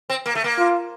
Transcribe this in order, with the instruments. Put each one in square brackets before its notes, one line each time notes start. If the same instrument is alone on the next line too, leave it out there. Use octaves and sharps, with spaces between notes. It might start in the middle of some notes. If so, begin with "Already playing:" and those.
[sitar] C4
A#3
A3
A#3
[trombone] F4